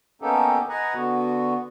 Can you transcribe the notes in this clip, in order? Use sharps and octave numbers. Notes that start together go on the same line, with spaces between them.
A#3 B3 C#4 D#4 G4 A4
B4 D#5 F#5 G#5 A#5
D3 B3 F#4